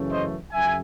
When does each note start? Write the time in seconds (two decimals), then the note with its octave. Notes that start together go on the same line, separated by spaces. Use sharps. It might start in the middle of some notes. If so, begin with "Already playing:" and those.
Already playing: F#2 C#3 E3 A3 C#4
0.12 C5 D#5
0.52 F#2 C#3 E5 G#5